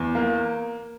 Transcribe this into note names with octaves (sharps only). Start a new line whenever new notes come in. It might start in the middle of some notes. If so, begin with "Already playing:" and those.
Already playing: E2
A#3